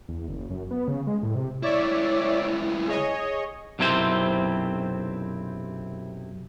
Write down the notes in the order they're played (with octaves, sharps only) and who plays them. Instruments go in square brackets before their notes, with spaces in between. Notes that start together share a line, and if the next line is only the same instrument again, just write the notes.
[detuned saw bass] E2
F#1
F#2
B3
C#3
G#3
A2
C3
[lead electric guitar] C#2 E4 [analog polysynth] C#5 D5 E5
[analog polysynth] G#4 C#5 D#5
[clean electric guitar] B1 F#2 C3 C4 E4 C5